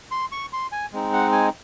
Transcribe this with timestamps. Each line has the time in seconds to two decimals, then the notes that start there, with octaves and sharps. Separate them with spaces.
0.11 C6
0.32 C#6
0.53 C6
0.72 G#5
0.93 G#3 C4 D#4
1.13 F#5
1.32 G#5